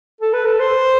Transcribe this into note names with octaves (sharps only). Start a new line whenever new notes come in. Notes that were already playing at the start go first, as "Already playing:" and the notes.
A4
B4
A4
C5